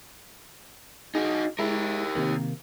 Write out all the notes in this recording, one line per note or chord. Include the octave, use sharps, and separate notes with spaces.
D#4 F#4 G#4
G#3 E4 G4 A#4
C3 D#3 A#3